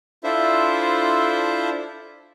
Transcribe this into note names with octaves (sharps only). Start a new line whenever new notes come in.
D4 E4 F4 A4 C5 E5